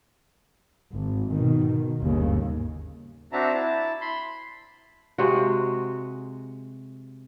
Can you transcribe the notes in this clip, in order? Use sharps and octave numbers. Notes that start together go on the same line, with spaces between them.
G#1
B2 D#3
G1 D#2 G#2 C#3
C4 D4 F#4 E5 A5 A#5
E4 A5
B5 C6
C3 G#3 F#4